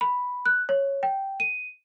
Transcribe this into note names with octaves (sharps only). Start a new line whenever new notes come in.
B5
F#6
C#5
G5
D#7